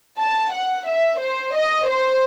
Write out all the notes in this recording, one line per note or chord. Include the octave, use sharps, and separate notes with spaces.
A5
F#5
E5
C5
D#5
C5